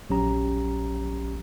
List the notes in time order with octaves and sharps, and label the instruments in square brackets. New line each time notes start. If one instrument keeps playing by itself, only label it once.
[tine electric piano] A#1 F#3 C#4 G4 A#5